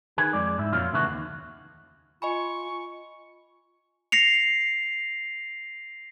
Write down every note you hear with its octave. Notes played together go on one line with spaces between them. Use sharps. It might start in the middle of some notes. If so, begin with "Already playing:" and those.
D#3 G#4 B4
F2 G#3 D5
G#2 E4
F2 A#2 F#3 F4
C#3 E3 A3 B3 F#4
D#2
F4 D#5 G#5 B5 C#6
A#6 C7 C#7 F7